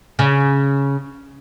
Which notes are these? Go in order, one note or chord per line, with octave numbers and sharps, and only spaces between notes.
C#3